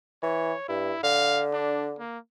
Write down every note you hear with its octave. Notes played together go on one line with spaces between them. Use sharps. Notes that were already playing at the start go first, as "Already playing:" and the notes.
E3 C#5
G2 E4
D3 F5
D4
A#3